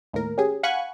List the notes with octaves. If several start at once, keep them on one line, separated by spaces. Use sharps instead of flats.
D#2 A2 A#4
C#4 G4 G#4
F5 F#5 G#5 B5 C#6 F#6